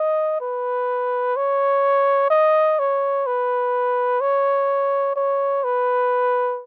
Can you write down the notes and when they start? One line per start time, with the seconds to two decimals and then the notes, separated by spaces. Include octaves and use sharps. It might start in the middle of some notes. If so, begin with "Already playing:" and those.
Already playing: D#5
0.41 B4
1.36 C#5
2.30 D#5
2.79 C#5
3.27 B4
4.21 C#5
5.16 C#5
5.64 B4